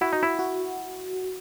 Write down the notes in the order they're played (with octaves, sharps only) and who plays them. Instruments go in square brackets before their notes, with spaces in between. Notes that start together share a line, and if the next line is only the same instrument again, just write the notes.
[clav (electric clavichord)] E4 [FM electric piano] F#4
[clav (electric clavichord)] D#4
E4
[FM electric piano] F#4